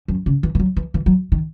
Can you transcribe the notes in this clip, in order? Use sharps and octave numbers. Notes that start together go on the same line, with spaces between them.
F#2
C#3
E3
E3
F#3
E3
E3
F#3
D#3